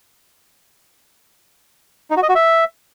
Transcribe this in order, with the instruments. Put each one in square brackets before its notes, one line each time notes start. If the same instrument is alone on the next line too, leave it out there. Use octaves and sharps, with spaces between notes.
[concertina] D#4
F#4
D#5
F#4
E5